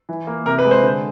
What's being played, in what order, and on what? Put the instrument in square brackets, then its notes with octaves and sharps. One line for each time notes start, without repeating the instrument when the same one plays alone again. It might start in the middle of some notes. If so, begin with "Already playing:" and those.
[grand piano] E3
A#3
C3 A#4
B4
G#3
C5
D3